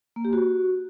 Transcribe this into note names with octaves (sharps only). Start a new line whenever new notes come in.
A#3
G4
F#4